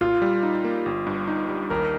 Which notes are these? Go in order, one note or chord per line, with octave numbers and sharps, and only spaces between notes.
A#2 F4
G3
D#4
A#3
G1
G2
D#4
G3
D#2 A#4